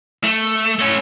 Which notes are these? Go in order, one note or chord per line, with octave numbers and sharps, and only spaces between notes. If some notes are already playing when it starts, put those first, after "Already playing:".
A3
A3 C#4